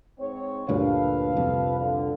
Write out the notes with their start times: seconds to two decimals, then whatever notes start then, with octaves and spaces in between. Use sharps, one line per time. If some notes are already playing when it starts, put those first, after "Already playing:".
0.19 G#2 C4 C#5
0.69 D2 G2 A#2 A4 B4 F5
1.37 C2 F2
1.79 D3